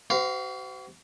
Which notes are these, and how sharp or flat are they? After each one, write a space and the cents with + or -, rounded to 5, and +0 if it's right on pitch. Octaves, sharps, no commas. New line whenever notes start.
F#4 +40 C5 -40 F5 +0